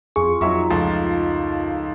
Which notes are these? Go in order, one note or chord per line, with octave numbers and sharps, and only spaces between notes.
F2 F4 G#4 C#6
F2 F#3 D#4 A#4 E5 C#6
C#2 F3 A3